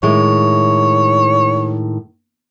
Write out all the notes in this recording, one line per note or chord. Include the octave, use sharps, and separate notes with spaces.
A2 D#3 G#3 C#5